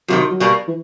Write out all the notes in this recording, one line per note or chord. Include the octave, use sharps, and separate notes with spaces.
F2 C3 D#3 F#3
F#3
B2 G3 A#3
E3